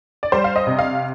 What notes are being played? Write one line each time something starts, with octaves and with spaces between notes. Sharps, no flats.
D5
G3 C5
F5
D#5
C3
F5